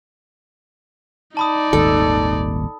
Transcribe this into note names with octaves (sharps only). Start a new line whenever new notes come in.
D#4 D5 A5 B5 D#6
D#1 G#1 D#2 A4